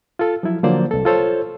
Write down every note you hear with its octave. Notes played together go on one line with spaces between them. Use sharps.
F4 A4
F3 F#3 E4
D3 F3 F#3 A#3 C5 D5
C2 A4
F4 A4 C5 C#5